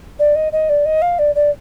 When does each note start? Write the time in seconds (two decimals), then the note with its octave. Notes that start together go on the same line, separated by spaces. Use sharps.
0.19 D5
0.35 D#5
0.52 D#5
0.69 D5
0.85 D#5
1.02 F5
1.19 D5
1.35 D5